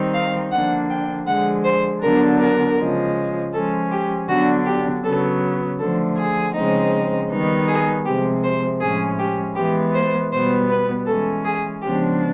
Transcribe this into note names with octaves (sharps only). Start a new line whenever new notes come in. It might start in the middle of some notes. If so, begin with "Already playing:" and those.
Already playing: D#3 G3 C4 D#4
F5
D3 F3 A#3 D4 F#5
G5
D3 F3 G#3 F#5
C5
D3 F#3 B3 D4 A#4
A#4
C#3 F3 G#3
F3 G#3 C#4 A4
G4
D3 F#3 B3 D4 F#4
G4
C#3 F#3 B3 A4
D3 F3 A3 A4
G#4
C#3 F3 G#3 C4 D#4
D#3 G3 B3 D#4
G#4
C3 F3 G#3 G4
C5
A2 F3 G#3 C#4 G#4
G4
E3 G#3 B3 G4
C5
B2 G3 B3 C5
B4
E3 G#3 C#4 A4
G#4
C#3 F3 G#3 B3 D4 G4